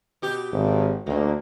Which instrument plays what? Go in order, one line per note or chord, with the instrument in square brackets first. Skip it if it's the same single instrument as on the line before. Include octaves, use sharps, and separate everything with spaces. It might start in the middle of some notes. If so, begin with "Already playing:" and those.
[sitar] B2 G4
[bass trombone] G#1
[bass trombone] D2 [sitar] D3 A#3